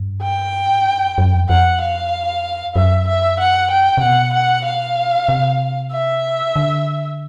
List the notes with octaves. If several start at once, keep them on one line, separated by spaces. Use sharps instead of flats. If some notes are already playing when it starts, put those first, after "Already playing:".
Already playing: G2
G5
A2
G#2
G2
F#2
F#2
F2
F2 F#5
F5
F#2 E5
E5
F#5
G5
C3
B2 F#5
F#5
F5
C3
E5
D3